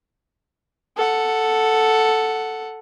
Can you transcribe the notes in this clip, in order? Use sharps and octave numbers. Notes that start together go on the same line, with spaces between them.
A4 F#5